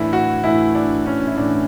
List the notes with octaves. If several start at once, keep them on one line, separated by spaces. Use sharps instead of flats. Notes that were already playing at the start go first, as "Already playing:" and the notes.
Already playing: A2 E3 D4 E4
F#4
A2 E3 E4
D4
C#4
E4
A2 E3 D4